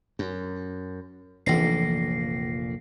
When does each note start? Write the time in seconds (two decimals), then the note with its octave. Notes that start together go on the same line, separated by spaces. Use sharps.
0.19 F#2
1.46 F1 A#1 A#2 E3 A#6 C7